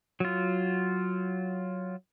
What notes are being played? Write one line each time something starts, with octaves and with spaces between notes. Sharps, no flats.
F#3 F4